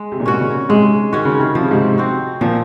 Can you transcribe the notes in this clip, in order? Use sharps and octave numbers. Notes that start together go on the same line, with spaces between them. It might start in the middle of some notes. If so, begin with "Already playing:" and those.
Already playing: G#3
C3
A#2
G#2 C3 C#4 F#4
A#2 C#3
G#2 C3 G#3
D#3 C#4 F#4
C#3
C3 D#3
C3 F3
C#3
G#2 C3
C4 F#4
A#2 F3